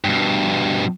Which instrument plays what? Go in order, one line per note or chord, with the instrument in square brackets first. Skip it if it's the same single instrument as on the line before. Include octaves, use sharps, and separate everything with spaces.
[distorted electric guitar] G2 B2